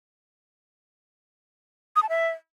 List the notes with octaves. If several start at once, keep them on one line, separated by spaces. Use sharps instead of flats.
D#6
A5
E5